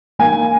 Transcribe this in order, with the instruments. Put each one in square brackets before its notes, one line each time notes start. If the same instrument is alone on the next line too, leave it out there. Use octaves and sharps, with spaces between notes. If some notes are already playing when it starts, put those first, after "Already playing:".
[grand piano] A#3 G#5